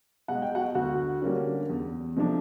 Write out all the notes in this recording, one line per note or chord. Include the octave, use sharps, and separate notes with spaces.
B2 G#3 F#5
G5
F#4 F#5
D2 F#4 F#5
D3 G3 A#3 C#4
E2
C3 F3 A3 D4